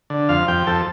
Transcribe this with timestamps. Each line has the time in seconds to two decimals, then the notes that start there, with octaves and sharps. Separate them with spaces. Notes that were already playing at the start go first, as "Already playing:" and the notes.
0.10 D3
0.29 F2 F5
0.48 F2 G5
0.67 F2 A4